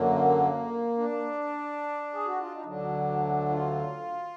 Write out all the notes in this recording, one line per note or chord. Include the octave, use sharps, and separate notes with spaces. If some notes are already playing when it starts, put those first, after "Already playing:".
Already playing: F#2 D3 F#3 A#3
D4
G#4
F#4
F4
D#4
D2 D3 F#3 D4
F4